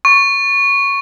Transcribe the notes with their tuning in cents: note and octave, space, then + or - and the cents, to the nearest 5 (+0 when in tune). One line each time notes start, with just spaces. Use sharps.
C#6 -5